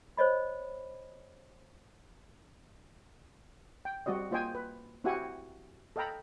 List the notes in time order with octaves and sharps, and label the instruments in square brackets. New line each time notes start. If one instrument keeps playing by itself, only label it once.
[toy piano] C5 C#5 D#5 B5
[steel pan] G5
G3 C4 F#4 D5 D#5
A#3 F4 C5 D#5 G5 G#5
B4
C4 E4 F#4 G4 F#5 G#5
A4 D#5 F5 G5 A#5 B5